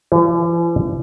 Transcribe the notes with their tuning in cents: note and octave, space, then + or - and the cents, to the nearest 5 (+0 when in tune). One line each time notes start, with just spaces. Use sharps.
E3 +45